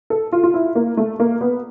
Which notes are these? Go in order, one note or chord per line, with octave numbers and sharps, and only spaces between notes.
A4
F4
F4
E4
A#3
A3
A#3
B3